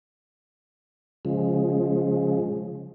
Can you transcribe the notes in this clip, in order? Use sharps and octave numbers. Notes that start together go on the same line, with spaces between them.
C#3 F3 G#3